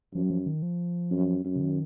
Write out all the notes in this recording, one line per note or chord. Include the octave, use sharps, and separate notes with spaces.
F#2 F3
F#3
F3
D#3
F3
F#2
F#2
C#3
D#3